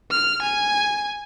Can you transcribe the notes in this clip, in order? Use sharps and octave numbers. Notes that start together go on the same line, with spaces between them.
F6
G#5